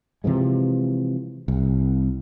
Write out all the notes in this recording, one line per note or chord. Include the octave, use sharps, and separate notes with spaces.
C3 E3 F3 G#3
C2